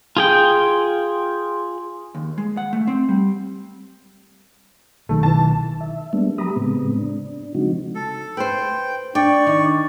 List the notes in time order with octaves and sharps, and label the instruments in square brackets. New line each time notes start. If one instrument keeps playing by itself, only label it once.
[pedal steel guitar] F4 G#4 G5
[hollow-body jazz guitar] D#2
G#3
F#5
A3
C4
G3
[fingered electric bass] B1 D#3 [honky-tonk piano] A3
[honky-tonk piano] E3 A5
[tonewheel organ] E5
G3 G#3 A#3 B3 D4
F#3 G4 A#5 B5 D#6
A2 C#3 G#3 B3 C4
D4
C#3 F3 G#3 C4 D#4 F#4
[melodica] A4
[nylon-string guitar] B4 C5 [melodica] G5
[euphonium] D4 [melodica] D5 C#6 [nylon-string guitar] G5
[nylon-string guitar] D#3